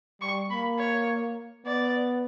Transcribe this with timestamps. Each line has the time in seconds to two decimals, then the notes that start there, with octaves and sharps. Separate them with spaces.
0.21 G3 C#6
0.50 A#3 B5
0.79 C#5
1.65 B3 D5